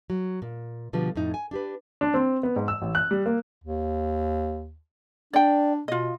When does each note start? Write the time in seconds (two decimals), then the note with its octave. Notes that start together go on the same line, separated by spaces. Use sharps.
0.10 F#3
0.42 A#2
0.93 B2 D3 F3 G3
1.15 F2 A2 D#4
1.34 G#5
1.51 D4 G4 B4
2.01 D4
2.14 C4
2.43 B3
2.56 G#2
2.68 E6
2.82 A1
2.95 F#6
3.11 G3
3.26 A#3
3.64 D#2
5.33 D4 D5 G5
5.88 B2 F4 D#5